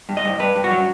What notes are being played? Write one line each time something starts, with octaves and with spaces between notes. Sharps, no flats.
G2
D#5
G2
G2 B4
G2
F#4
F#3